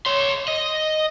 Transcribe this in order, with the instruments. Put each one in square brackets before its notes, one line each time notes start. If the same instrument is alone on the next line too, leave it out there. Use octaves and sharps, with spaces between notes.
[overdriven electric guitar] C#5 C6
D#5